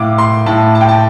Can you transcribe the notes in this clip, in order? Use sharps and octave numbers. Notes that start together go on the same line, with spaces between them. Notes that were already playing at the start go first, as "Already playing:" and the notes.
Already playing: A2 F5 D6
C6
A2 A5
A5
G5
A5